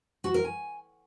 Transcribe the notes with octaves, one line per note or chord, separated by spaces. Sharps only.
F#4
A#4
G#5